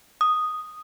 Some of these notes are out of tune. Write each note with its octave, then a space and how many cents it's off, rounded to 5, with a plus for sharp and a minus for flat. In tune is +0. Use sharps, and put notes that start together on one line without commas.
D#6 -5